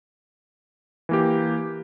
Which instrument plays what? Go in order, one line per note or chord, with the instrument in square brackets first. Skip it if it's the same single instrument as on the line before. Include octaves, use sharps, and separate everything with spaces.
[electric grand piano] E3 A#3 G4